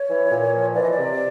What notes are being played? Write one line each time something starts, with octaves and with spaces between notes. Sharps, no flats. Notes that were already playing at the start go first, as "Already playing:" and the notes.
Already playing: C#5
E3
A#2
F3
E3 D5
D#5
D5
C3